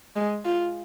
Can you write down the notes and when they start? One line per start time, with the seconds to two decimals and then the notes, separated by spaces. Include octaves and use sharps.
0.16 G#3
0.45 F4